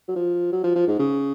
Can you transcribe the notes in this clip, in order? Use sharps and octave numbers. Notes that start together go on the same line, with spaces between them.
F#3
F3
F#3
F3
F3
G#2
C#3